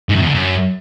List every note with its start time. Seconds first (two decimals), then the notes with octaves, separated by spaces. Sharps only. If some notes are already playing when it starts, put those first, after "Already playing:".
0.09 G#2
0.15 F#2
0.22 E2
0.28 D3
0.34 F#2